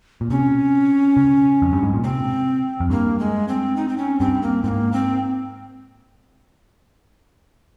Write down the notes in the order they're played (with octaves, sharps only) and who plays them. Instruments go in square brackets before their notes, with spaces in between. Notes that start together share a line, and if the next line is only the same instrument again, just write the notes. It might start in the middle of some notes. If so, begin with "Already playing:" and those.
[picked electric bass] A#2
[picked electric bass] C3 [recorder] C#4
[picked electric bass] C#3
F2
G2
G#2
A#2
[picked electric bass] C3 [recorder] C4
[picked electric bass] F2
[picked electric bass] G2 [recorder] A#3
[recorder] G#3
C4
D#4
C4
C#4
[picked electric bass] G2 [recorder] C4
[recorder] A#3
[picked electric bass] G#2 [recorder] C4
[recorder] A#3
C4